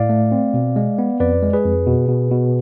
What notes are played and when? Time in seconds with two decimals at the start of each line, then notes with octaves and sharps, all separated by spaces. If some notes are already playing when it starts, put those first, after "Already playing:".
Already playing: A2 D5 F5
0.09 A3
0.32 C4
0.54 B2
0.76 G#3
0.98 B3
1.20 F2 B4 D5
1.43 G#3
1.53 G#4 B4
1.65 F2
1.87 B2
2.09 B2
2.31 B2